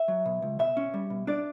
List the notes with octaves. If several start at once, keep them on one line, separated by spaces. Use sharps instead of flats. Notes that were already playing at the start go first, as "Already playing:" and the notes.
Already playing: E5
F#3
B2
C#2
B2 E5
C#4
G3
B2
D4 D5